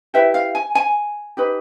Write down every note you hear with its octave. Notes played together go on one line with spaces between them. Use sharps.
E4 G4 B4 E5
F5
G#5
G#5
D#4 G4 B4